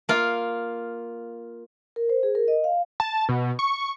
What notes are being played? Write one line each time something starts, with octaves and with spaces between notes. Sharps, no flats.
A#3 F4
A#4
C5
G#4
A#4
D#5
F5
A5
B2
C#6